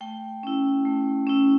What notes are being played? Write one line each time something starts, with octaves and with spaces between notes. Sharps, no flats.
A3 G5
C#4 E4
A3
C#4 E4